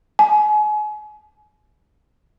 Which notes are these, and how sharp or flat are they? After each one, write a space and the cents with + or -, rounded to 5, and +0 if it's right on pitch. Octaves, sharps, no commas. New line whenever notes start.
G#5 +35